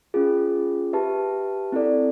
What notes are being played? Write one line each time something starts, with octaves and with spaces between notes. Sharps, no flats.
C#4 F4 G#4
G4 B4 E5 A5
C4 E4 A4 D5